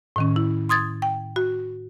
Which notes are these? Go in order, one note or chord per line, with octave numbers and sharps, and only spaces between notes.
A2 D#3 C#4
E4
C6 D#6 G#6 A6
G5
F#4